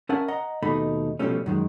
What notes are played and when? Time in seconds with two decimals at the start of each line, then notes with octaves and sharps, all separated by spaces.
0.09 C#4 A#4 E5 F#5 G#5 A5
0.28 D#5 F#5 A#5
0.63 D#2 B2 A3 D#4 B5
1.19 B2 D3 F3 G3 A3 C#4
1.46 F#2 D#3 G#3